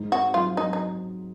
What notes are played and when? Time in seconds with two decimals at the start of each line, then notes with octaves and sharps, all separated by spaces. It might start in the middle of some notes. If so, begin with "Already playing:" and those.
Already playing: G#2
0.11 C4 F#4
0.34 F#3 F4
0.57 F#3 D#4
0.73 D#4